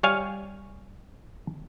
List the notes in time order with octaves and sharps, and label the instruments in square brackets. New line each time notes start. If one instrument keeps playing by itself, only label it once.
[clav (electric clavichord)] G3 C#5 F5 G#5